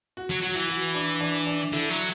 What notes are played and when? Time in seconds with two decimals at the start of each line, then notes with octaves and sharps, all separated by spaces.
0.17 F#4
0.30 F#3
0.42 F#3 F#4
0.56 E3
0.69 F#4
0.94 D4
1.21 D4
1.47 D4
1.72 D3 E4
1.90 F#3